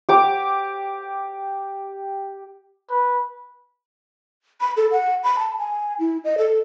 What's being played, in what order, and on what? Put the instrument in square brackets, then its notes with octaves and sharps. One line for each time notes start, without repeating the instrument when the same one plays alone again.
[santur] G4 D6
[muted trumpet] B4
[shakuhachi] B5
A4
F#5
B5
A5
G#5
E4
D#5
A4